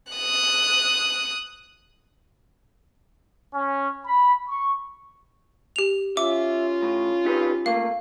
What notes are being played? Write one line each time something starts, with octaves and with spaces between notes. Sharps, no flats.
D#6 F#6
C#4
B5
C#6
G4 F7
C#4 F4 E5 D6
A2
D#4 G4 B4
A3 A#3 F5